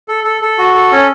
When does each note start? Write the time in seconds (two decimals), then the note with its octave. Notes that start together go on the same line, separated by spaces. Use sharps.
0.08 A4
0.24 A4
0.42 A4
0.58 F#4
0.74 A4
0.91 C#4